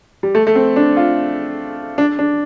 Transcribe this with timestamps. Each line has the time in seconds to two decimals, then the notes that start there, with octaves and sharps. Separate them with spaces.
0.23 G3
0.35 A3
0.47 A3
0.55 C4
0.76 D4
0.97 F4
1.98 D4
2.19 D4